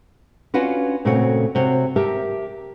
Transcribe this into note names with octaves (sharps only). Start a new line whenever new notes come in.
C#4 D4 F4 F#4 B4
A#2 C#3 A3 C4 F#4 C#5
C3 F#4 C#5
G4 A#4 E5 A5